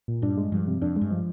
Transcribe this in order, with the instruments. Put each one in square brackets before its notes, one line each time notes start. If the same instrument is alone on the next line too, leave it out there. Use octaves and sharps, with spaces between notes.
[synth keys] A#2
[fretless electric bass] G2 [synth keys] D4
[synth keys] G#3
[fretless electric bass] G2 [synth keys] F3
[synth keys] C3
[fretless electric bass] F2 [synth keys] D4
[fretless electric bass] G2 [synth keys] G#3
[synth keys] F3